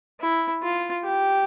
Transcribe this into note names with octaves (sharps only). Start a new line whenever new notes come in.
E4
F4
G4